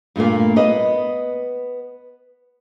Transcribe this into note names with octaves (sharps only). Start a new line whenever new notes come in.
G2 A#2 A3 A#3
B3 B4 D#5